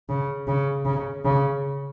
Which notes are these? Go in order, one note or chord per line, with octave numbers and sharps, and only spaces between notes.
C#3
C#3
C#3
C#3